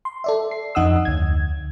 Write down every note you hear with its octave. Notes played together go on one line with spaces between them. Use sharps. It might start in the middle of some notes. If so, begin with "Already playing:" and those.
C6
A4 D5 E5
C7
F2 D#4 F#5 D#6 E6
D2 G#6